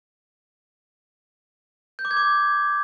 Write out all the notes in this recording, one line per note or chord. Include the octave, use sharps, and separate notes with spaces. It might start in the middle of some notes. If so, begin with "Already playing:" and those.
G6
D6
G#6
D6